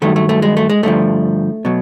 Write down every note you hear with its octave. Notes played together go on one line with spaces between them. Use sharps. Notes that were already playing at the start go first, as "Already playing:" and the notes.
G2 D#3 F#3 A3
A3
A3
G#3
A3
G#3
G2 D3 F3 A3
B2 F#3